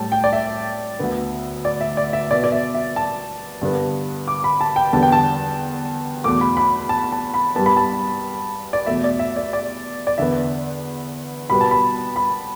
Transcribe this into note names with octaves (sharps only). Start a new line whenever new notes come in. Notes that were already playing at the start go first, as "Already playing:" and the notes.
Already playing: A2 G3 A5
G5
D5
E5
D2 D3 B3
D5
E5
D5
E5
B2 B3 D5
D5
E5
E5
A5
G2 D3 B3
D6
B5
A5
G5
E2 D3 G3 B3 A5
G5
A5
E2 B2 A3 D6
B5
B5
A5
A5
B5
G2 G3 B3 A5
B5
A5
D5
E2 B2 A3 E5
D5
E5
D5
D5
D5
E2 D3 B3 E5
B2 G3 B3 B5
A5
B5
B5